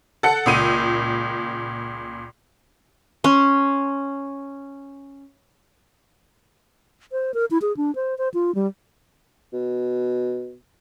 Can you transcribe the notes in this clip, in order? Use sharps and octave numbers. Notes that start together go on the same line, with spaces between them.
A4 F#5 C#7
C#2 A#2 D#7
C#4 C6
C5
A#4
E4
G#4
D4
C5
C5
F4
G3
B2